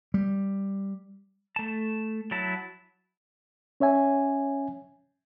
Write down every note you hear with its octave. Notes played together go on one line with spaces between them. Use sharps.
G3
A3 A5
F#3 E4 A5
C#4 C#5 E5 G#5